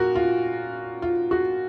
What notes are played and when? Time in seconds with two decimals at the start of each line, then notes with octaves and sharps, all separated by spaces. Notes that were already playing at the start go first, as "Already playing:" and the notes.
Already playing: A#2 F#4 A#4
0.15 F4
1.02 F4
1.31 F#4